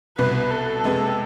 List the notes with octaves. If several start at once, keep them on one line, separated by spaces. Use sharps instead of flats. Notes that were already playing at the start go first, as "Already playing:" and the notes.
C2 B2 B3 B4
A4
C3 G#3 B3